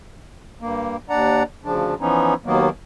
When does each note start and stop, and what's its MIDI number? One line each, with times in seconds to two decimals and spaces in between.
0.61 0.97 43
0.61 0.97 58
1.09 1.43 39
1.09 1.43 62
1.09 1.43 74
1.09 1.43 78
1.09 1.43 82
1.65 1.94 38
1.65 1.94 49
1.65 1.94 53
1.65 1.94 62
2.00 2.34 52
2.00 2.34 53
2.00 2.34 59
2.00 2.34 61
2.00 2.34 63
2.45 2.69 39
2.45 2.69 51
2.45 2.69 54
2.45 2.69 58
2.45 2.69 59